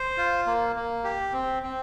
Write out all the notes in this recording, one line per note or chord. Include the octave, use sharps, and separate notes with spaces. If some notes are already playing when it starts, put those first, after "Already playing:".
Already playing: C5
F4
A#3
A#3
G4
C4
C4